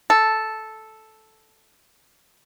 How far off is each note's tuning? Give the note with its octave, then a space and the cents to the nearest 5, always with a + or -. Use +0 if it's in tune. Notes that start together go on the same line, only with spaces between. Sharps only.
A4 -5